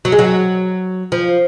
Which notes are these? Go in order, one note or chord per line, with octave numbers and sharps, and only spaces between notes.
F#3
G#3
F#3
F3